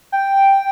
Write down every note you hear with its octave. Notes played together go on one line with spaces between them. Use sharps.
G5